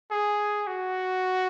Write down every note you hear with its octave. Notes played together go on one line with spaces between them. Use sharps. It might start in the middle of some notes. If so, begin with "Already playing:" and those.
G#4
F#4